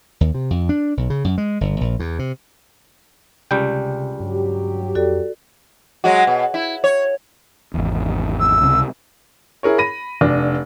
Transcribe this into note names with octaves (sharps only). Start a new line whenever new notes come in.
D#2
C3
F2
D4
B1
C#3
F#2
G#3
G1
A#1
E2
C3
C#2 C3 G3 G5
G2 F#3 G4
F2 F#4 A4 D5
F#3 G#3 F#4
B2
E4
C#5
G#1 E2
E6
C#2 C3
E4 G#4 A#4 C#5
B5 A#6 D#7
F1 D4